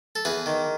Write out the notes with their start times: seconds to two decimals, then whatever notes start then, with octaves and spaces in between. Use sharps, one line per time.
0.16 A4
0.25 E2 G#4 B4
0.46 D#3